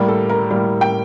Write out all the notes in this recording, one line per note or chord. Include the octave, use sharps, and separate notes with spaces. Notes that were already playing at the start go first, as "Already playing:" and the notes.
Already playing: A2 G3 A#3
A4
A#4
A2 G3 A#3
G5